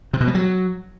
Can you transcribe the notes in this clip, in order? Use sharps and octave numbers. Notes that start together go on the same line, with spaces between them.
C3
B2
G3
F#3